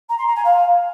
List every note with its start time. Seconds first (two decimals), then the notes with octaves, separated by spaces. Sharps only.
0.09 A#5
0.18 C6
0.27 A#5
0.35 G#5
0.44 F5